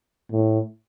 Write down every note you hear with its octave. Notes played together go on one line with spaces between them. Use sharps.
A2